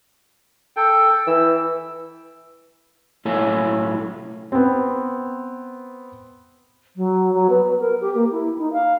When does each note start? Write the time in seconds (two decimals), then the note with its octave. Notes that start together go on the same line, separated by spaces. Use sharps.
0.76 A4 G5
1.27 E3 E6
3.25 B1 A2 F4 A4 C#5 G#5
4.52 B3 C4
6.96 F#3
7.34 F#3
7.50 B3
7.80 A#4
8.01 G4
8.15 A#3
8.31 E4
8.58 D#4
8.73 F5